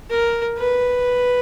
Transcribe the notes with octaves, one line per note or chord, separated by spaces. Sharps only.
A#4
B4